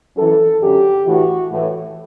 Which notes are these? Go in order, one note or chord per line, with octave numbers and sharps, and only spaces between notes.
F#2 E3 A4
F#2 D3 G4
A2 E3 F#4
A2 E3